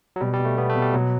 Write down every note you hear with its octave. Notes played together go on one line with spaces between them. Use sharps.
F#3
B2 G3
G3
B2
A3
B2 B3
A3
B2
G3
B2 F#3